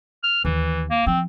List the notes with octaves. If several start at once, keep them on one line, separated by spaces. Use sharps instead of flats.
F6
D#2 E3
A#3
F3 C4